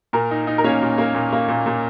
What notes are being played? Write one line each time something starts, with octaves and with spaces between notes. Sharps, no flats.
A#2 A#4
D#4
D#4
A#4
A#3 C#4 C#5
A#2
A#3
A#2
A#3
A#2
A#2